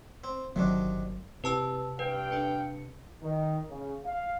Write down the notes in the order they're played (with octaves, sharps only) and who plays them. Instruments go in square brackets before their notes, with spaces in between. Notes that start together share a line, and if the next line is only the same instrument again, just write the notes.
[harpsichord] C4
[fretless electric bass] G1 F#3 [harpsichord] C3 D#3 D4
[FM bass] C3 [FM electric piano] C4 E4 G4 [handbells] B4 A5 E6
[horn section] G2 F5 G5 [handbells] B4
[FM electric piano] D4 A4 C#7
[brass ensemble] D#3
C#3
F5